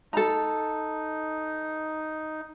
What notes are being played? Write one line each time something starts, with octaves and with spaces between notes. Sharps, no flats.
D#4 A4 A#5